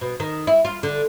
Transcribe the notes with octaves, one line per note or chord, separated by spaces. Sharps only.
B2
D#3
E4
F4
D3